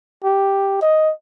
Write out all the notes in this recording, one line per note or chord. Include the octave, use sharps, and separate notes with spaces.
G4
D#5